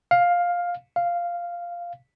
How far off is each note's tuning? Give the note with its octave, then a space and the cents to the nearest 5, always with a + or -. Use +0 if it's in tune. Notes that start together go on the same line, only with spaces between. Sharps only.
F5 +10
F5 -5